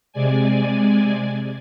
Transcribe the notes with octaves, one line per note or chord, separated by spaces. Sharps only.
C3 G#3 D5 G#5